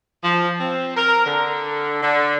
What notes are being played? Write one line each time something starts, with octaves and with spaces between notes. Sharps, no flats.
F3
C4
A#4
D3
D3